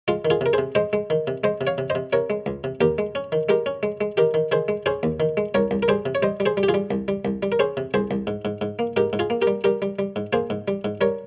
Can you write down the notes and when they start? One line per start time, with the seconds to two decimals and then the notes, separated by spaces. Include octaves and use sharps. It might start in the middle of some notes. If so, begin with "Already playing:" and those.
0.08 G#3 F4
0.25 D#3
0.30 F4 G#4
0.41 C3 A#4
0.53 C3 G#4 C5
0.75 G#3 C5 D#5
0.93 G#3
1.10 D#3
1.27 C3
1.44 G#3 C5 D#5
1.61 C3
1.67 C#5 F5
1.78 C3
1.90 C5 D#5
1.95 C3
2.13 C3 A#4 C#5
2.30 G#3
2.46 C#2
2.64 C3
2.81 D#2 G4 A#4
2.98 G#3
3.15 C#4
3.32 D#3
3.49 G#3 G4 A#4
3.66 C#4
3.83 G#3
4.01 G#3
4.17 D#3 G4 A#4
4.34 D#3
4.52 D#3 G#4 C5
4.68 G#3
4.86 C#4 G#4 C5
5.03 D#2
5.20 D#3
5.37 G#3
5.54 C2 A#4 C#5
5.71 C2
5.83 A#4
5.88 G3 G#4 C5
6.06 C3
6.15 C#5
6.22 G3 C5 D#5
6.40 G3
6.46 G#4 C5
6.57 G3
6.63 G4
6.69 F4 G#4
6.74 G3
6.91 C2
7.08 G3
7.25 C2
7.43 G3
7.52 A#4
7.59 C#4 G#4 C5
7.77 C3
7.94 C2 G#4 C5
8.11 C2
8.27 G#2
8.45 G#2
8.61 G#2
8.79 A#3
8.96 G#2 G4 A#4
9.13 G#2
9.19 F4 G#4
9.30 A#3
9.42 G4 A#4
9.47 G3
9.64 G3 G4 A#4
9.82 G3
9.99 G3
10.16 G#2
10.33 A#3 G#4 C5
10.50 G#2
10.68 G3
10.84 G#2
11.01 G3 A#4 C#5